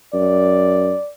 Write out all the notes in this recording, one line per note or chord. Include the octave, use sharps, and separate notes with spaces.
F#2 D5